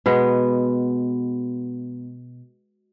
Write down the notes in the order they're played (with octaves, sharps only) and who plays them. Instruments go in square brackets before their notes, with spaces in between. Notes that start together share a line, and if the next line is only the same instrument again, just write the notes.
[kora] B2 G#3 B3